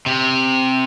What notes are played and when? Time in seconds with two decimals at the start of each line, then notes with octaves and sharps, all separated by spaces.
0.06 C3